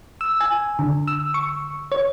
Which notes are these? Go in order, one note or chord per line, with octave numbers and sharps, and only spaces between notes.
E6
G#5
D3
E6
C#6
C#5